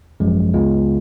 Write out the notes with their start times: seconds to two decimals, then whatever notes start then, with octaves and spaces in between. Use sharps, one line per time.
0.20 G#1 F#2 F3 G#3
0.54 C#2 C#3 G#3 B3 F4